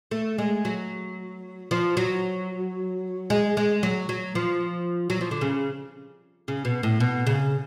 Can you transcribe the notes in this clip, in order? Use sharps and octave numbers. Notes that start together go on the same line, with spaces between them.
A3
G#3
F#3
F3
F#3
G#3
G#3
F#3
F#3
F3
F#3
F3
D3
C#3
C#3
B2
A2
B2
C#3